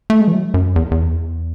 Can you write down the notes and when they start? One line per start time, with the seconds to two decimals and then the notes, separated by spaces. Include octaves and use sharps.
0.10 A3
0.21 G#3
0.28 E3
0.32 F#3
0.54 F#2
0.76 E2
0.91 E2